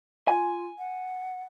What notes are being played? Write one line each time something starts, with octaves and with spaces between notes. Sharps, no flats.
F4 G#5
F#5